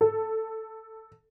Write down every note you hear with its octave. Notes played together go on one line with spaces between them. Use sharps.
A4